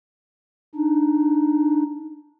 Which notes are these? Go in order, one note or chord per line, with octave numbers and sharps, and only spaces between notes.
D4 D#4